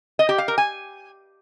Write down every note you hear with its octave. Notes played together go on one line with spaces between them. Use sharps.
D#5
G4
F5
A#4
G#5